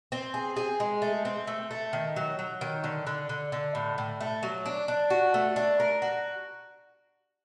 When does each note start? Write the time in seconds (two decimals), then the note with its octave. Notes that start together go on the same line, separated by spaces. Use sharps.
0.12 C4
0.34 G#4
0.56 G#4
0.80 G#3
1.02 A3
1.25 C4
1.47 A3
1.71 A3
1.93 D#3
2.16 F#3
2.39 F#3
2.61 D#3
2.84 D3
3.07 D3
3.29 D3
3.52 D3
3.75 A2
3.98 A2
4.21 A3
4.43 F#3
4.66 D4
4.88 D4
5.10 F#4
5.34 A3
5.56 D4
5.80 A#4
6.02 F#4